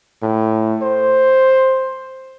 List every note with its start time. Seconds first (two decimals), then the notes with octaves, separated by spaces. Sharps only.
0.23 A2
0.82 C5